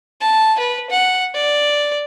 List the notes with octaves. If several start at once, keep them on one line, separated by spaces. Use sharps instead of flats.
A5
B4
F#5
D5